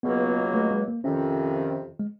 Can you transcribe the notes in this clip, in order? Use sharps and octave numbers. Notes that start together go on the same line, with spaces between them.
C#2 B2 F#3 A#3 B3
A3
G#3
A#3
F2 C3 D#3 C#4
G#3